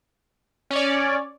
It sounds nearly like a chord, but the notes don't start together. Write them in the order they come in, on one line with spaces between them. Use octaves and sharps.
C#4 C#5 D5